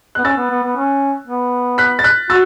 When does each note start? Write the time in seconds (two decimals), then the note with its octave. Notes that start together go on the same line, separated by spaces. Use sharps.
0.15 B3 F#6
0.24 C#4 E6 A6
0.37 B3
0.50 B3
0.63 B3
0.76 C#4
1.27 B3
1.78 F#6 B6
1.99 A6
2.04 F#6 B6
2.29 F#4 E6 A6